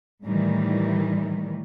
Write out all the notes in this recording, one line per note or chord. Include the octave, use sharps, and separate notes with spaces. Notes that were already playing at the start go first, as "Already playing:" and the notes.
A2 D#3 E3 G3